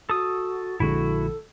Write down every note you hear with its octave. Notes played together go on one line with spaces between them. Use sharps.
F#4 A4 D#6
A#1 D3 G#3 E4 F#4 A4